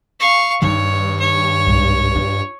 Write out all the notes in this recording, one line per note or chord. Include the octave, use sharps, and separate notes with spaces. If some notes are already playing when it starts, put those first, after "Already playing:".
F5 C#6
G2 D#3 D#4 C#5
C#5
C2 G#2
D4 F4